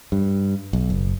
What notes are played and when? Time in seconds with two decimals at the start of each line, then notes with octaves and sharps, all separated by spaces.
0.12 G2
0.73 B1
0.90 F#1